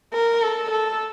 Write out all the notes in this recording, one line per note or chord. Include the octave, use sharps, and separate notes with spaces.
A#4
A4
A4